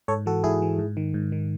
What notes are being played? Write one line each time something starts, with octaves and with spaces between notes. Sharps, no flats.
G#2 A4 C#5
E3 F#4 A4
G#2 E4 G#4
E3
G#2
D#3
G#2
D#3